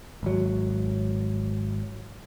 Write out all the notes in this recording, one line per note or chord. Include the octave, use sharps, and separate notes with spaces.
G#1 F#3